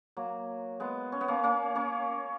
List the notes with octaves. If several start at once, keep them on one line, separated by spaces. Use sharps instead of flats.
F#3 A#3
G#3 B3
C#4
B3
A#3 C#4
A#3 C#4
A#3 C#4